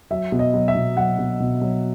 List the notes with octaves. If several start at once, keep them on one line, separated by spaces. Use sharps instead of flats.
F#3 E5
B2
D#5
F#3
E5
B2
F#3 F#5
B2
B2
F#3